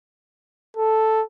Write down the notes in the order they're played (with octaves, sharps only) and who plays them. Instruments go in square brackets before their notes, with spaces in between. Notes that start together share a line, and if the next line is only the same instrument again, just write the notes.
[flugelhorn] A4